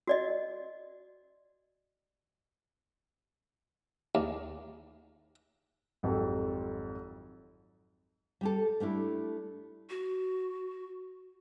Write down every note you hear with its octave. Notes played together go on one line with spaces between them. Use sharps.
F#4 D5 D#5
D#2
G#1 F2 F#3 G4 A4
G3 G4 A4
G3 A3 D4 E4
F#4